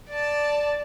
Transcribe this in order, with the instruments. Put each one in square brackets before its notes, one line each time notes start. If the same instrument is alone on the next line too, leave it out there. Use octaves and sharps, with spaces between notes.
[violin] D5 A5